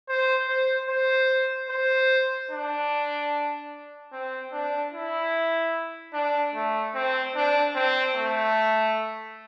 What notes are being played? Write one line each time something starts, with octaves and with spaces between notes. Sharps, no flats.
C5
C5
C5
C5
D4
C4
D4
E4
D4
A3
C4
D4
C4
A3